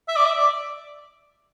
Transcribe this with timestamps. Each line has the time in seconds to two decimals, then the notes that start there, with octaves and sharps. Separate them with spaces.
0.08 E5
0.16 D5
0.26 E5
0.38 D5